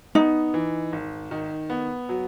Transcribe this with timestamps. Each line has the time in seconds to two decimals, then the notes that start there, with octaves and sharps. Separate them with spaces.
0.15 B3 D#4
0.54 E3
0.93 G#1
1.31 D#3
1.70 B3
2.09 F#3